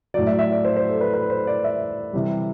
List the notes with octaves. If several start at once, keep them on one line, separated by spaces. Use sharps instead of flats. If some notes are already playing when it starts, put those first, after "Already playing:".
A2 F#3 D5
E5
E5
D5
C5
C5
A4
B4
B4
C5
D5
E5
C3 E3 G3